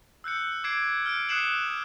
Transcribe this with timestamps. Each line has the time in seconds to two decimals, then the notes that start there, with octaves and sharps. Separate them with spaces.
0.24 E6 F#6 G6 C#7
0.64 D6 G#6 C7 D7
1.06 F6 G6 D7
1.29 D#6 F#6 C7 C#7 E7 F#7